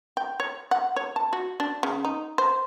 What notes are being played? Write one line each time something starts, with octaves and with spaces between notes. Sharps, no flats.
G5
C#5
F#5
C#5
A5
F#4
D4
C#3
D#4
C5